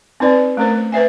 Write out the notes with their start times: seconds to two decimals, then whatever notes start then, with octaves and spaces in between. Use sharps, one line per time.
0.20 C4 D#4 B4 D5
0.57 A3 C#4 A#4 C5
0.92 B4 C5 E5 G#5